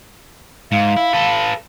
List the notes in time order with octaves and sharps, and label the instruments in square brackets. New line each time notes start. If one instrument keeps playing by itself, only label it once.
[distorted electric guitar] G#2 [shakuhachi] F5
[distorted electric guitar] E4
A4 B4